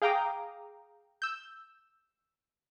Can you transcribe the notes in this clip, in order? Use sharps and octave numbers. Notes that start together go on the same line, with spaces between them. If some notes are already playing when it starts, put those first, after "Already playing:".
G#4 F5 G5 A#5 D6 D#6
E6 G6